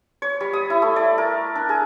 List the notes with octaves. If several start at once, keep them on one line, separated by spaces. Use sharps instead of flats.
C#5
G3
D#6
E4
A3
D5
A#4
D4
G#4